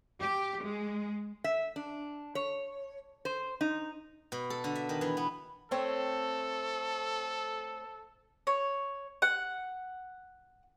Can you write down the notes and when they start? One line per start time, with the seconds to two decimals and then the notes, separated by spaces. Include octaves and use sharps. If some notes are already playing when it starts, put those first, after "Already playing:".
0.20 G4
0.63 G#3
1.44 E5
1.76 D4
2.35 C#5
3.25 C5
3.61 D#4
4.32 B2
4.50 A4
4.64 D3
4.75 E5
4.89 D#3
5.01 E3
5.17 B3
5.71 A3 C4 A4 C#5
8.47 C#5
9.22 F#5